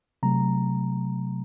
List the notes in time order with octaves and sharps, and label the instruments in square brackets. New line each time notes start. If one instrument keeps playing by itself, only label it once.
[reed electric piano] C3 F#3 A3 A#5